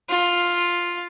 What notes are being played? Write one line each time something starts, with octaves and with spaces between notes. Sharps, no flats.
F4